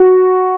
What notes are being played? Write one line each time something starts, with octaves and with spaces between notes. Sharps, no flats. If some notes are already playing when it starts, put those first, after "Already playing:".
Already playing: F#4